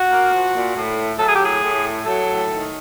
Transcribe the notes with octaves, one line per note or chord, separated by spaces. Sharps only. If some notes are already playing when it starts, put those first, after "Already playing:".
Already playing: F#4
A#3
F3
A#2
A2
A3
F#3 A4
G#4
G4
A2 G#4
A2
A3
F#3 A4
A2
D#3